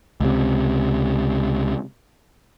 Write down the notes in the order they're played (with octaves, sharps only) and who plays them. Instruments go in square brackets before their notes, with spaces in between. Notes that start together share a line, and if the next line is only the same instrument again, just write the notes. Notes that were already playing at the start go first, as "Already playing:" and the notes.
[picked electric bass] C#2 C3